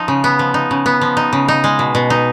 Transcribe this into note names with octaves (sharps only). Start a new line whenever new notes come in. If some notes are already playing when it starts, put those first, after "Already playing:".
Already playing: F3 D#4
C#3
B3
F3
D#4
C#3
B3
F3
D#4
C#3
D#4
G#3
B2
B2
D#4